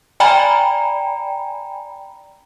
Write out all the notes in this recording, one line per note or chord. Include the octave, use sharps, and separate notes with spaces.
D5 G5 G#5 A#5 B5